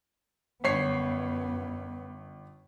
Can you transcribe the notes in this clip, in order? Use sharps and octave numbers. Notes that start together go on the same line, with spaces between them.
G1 F#2 B3 C#5 C7